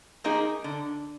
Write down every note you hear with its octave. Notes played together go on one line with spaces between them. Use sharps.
F3 A#3 D#4 G#4
D3